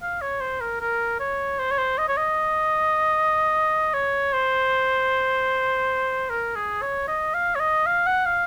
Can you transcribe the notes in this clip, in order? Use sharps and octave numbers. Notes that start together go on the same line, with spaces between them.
F5
C#5
C5
A#4
A#4
C#5
C5
C#5
C5
D#5
C#5
D#5
C#5
C5
A#4
G#4
C#5
D#5
F5
C#5
D#5
F5
F#5
F5